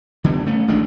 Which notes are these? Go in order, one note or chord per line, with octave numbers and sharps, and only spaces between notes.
D3 E3 G3 B3
A3 C#4
A1 D#3 G#3 D4